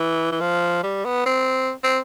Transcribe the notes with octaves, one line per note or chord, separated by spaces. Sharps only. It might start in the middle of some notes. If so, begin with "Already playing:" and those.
Already playing: E3
E3
F3
G3
B3
C4
C4